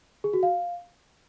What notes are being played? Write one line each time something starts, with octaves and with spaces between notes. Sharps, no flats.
G#4
F#4
F5